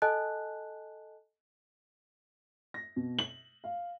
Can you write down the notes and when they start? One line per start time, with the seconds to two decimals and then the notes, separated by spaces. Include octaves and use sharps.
0.02 A4 D#5 G#5 A5 F#6
2.74 A#6
2.96 B2
3.19 F#7
3.64 F5